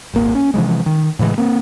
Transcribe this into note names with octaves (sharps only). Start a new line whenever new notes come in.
D#1 G#1 A#3
C#4
C3 E3 F3 G#3
D#3
A2 C#3 E3 G#3
A#3 C4